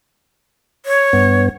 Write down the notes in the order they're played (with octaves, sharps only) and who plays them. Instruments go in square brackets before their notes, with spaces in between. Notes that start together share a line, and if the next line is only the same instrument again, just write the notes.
[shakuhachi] C#5
[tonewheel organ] G2 B3